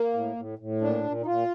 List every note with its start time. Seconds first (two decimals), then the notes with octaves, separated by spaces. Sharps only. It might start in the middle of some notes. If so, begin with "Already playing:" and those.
Already playing: A#3
0.14 A2
0.36 A2
0.59 A2
0.81 A#2 D4
1.04 A#2
1.22 D#4
1.26 A#2 F4